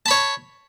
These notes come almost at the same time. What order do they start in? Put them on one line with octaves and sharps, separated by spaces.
A5 B5 C#5